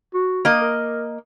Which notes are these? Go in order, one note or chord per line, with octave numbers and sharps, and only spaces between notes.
F#4
A#3 D#5
A#4